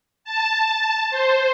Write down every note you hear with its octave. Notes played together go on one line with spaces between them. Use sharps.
A5
C5